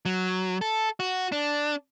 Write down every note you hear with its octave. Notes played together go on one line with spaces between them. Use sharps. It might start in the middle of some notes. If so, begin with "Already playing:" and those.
F#3
A4
F#4
D4